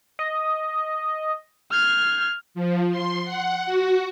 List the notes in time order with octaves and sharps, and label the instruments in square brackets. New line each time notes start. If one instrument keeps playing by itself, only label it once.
[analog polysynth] D#5
[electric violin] F6 [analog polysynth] G6 G#6 C7
[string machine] F3
C6
F#5
F#4